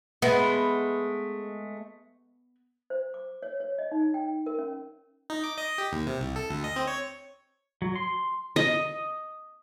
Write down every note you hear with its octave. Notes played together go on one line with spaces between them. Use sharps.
G#3 A3 B3
C5
D6
C#5
C#5
D#5
D#4
G5
A#4
C#4
D#4
D6
D#5
G4
D#2
C3
C2
A4
D2
D#5
C4
C#5
F#3
C6
D#5